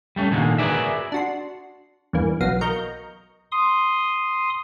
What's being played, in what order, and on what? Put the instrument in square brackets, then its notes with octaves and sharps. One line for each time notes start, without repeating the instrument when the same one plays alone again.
[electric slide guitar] G3 A3 C#4
A#2 D3 D#3 G#3 A#3
F#4 G#4 A#4 B4 D5 E5
[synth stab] D4 F#4 C6
E2 G2 E3 A#3
B1 F#3 B3 F5 A#6 C7
A#4 D#5 A#5 C#6 G6
[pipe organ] C6 D#6